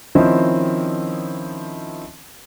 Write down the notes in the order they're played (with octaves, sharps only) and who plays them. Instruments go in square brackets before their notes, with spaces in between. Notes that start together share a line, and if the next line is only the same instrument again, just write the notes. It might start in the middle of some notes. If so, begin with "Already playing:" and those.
[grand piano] D#3 F3 C4 C#4 E4 D#5